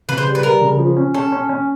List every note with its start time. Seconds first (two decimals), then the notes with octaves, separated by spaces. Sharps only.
0.09 C#3 B4
0.18 C5
0.26 G3
0.35 B4
0.43 G3 A#4
0.61 C#3
0.79 F3
0.97 C#4
1.14 C#4 A4
1.32 C#4
1.49 C#4